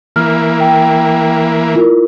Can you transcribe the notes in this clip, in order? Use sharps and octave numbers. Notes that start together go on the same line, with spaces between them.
E3 A#3 F6
G5
E4 F4 A#4